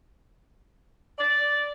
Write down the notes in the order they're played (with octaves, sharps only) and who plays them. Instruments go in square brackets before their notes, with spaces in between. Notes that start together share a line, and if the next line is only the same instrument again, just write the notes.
[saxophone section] D5